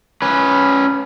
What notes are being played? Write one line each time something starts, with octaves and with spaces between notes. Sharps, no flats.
C#4 B4